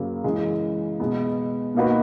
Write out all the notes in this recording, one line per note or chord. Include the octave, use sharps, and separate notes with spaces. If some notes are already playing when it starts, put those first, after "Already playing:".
Already playing: F#2 C#3 F#3 A#3
C#3 E3 G#3
B2 G#3 B3
B2 A#3 D#4 F#4 B4